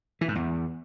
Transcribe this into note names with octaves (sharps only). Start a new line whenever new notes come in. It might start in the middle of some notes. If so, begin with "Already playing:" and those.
E3
G#2
E2